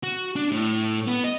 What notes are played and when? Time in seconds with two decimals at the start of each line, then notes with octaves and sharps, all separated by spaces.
0.03 F#4
0.36 D4
0.52 A2
1.07 B3
1.24 D#5